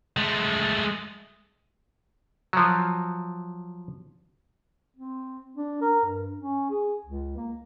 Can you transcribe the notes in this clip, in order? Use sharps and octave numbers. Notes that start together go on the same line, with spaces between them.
G#3 A3
F3 F#3
C4
D4
A#4
G2
C#4
G#4
C#2
A#3